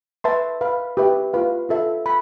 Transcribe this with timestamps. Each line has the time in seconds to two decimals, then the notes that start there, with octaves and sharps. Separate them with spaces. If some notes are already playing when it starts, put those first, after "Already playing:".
0.24 B4 E5 A5 C6
0.61 B4 F5 B5
0.97 G4 B4 E5
1.33 F4 B4 F5
1.69 F4 A4 E5
2.06 B5